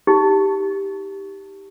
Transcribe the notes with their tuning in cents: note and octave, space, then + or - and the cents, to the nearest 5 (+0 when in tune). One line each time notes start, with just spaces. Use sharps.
D#4 +35 G4 +0